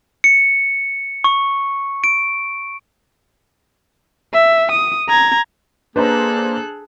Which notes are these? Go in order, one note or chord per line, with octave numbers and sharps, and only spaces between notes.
C#7
C#6
D7
E5
D#6
A#5 G#6
A#3 D4 G#4 A4 B4 C5 A#5 F#6